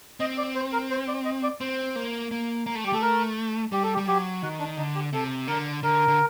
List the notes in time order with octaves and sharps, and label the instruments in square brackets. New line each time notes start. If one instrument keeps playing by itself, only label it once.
[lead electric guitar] C4 [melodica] D#5
[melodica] D5
C5
A#4
C5
D5
D#5
D5
[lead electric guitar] C4 [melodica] C5
[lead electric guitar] A#3
A#3
A#3
A3
[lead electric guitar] G3 [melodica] G4
[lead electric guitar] A3 [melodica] A4
[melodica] A#4
[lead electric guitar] G3 [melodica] G4
[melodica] A4
G4
[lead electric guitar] G3
[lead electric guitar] F#3 [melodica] G4
[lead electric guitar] D#3 [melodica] F#4
[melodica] D4
[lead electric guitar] D3 [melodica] D#4
[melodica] G4
[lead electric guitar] C3 [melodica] A4
[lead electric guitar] D3 [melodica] A#4
[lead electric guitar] D3 [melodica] A#4
[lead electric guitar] D3